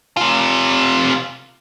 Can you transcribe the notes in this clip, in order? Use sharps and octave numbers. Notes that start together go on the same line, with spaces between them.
C3 F4